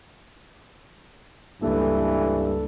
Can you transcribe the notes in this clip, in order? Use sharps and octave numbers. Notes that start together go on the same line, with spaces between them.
C#2 G2 E3 A#3 A4